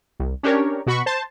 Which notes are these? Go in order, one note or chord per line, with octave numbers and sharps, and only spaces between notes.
C2
C#4 D4 G4 A#4 C#5
B2 F#4 B5 C#6
C5 A5